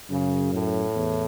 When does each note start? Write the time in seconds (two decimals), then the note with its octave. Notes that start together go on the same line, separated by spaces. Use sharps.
0.10 F#2 C#3
0.53 A2
0.95 E2